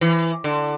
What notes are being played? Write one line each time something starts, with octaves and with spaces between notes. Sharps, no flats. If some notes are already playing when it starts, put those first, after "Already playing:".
E3
D3